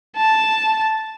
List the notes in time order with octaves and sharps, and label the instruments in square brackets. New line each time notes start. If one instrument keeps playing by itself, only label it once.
[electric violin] A5